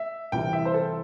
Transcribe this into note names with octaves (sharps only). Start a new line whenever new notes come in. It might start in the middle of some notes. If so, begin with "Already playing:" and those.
Already playing: E5
C2 C3 E3 G5
E5
C5
A4